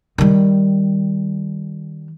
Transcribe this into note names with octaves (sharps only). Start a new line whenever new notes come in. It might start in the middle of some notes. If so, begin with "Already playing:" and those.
D#3 G3